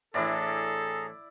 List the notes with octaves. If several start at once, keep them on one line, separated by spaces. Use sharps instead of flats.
A2 E3 D4 E4 G#4 A4 D5 A#5